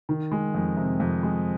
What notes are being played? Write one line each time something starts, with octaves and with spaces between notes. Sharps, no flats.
D#3
G#3
F2
C3
F2
G#3